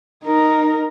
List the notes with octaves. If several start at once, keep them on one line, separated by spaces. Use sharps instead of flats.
D#4 A#4